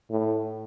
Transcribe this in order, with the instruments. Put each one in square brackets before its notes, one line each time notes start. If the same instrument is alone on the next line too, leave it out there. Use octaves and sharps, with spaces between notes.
[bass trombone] A2